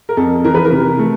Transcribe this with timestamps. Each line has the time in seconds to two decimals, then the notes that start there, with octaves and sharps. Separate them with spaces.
0.09 A#4
0.17 F2 A4
0.44 E3 A#4
0.54 B4
0.65 A#4
0.71 C3
0.99 A3